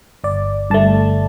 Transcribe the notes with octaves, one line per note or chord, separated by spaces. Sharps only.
G1 D5
G2 D3 A3 A5